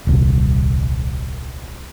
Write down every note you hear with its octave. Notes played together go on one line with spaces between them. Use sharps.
D#1 C2